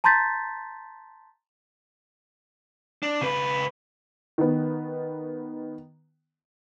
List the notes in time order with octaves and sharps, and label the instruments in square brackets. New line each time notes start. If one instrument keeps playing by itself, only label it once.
[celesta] A5 A#5 C6 G6 A6 B6
[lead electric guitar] D4
C#3 B4
[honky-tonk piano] D#3 B3